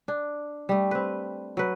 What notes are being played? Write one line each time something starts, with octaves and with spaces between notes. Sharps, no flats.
D4
G3 A3
C4 B4
F#3 B4